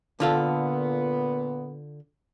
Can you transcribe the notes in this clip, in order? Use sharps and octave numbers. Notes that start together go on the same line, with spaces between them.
A#2 D3 B3 F4 A4